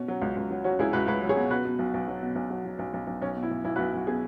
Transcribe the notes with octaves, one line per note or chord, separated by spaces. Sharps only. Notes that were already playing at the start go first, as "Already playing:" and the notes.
Already playing: B2 C#4
F#3
C#2
C#2
F#3
F#3 C#4 F#4
C#2 E4 G#4
C#2 F#4 B4
C#2 F#4 B4
F#3
G#4 C#5
B2
B2 F#4 B4
B2
B1
B1
F#3
B2
B1
F#3
F#3
B1
B1
B1
B1 C#4
B2
E4
B1
B1 E4
F#4 B4
B1
B1 F#4
B2 G#4